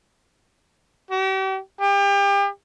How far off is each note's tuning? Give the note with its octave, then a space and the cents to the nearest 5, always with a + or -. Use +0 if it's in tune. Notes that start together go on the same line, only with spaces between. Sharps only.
G4 -40
G4 +35